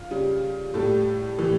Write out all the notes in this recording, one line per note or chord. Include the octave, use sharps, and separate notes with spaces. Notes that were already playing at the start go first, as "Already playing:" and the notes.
Already playing: F4
C#3 G3
A2 G3 A4
A2 E3 G3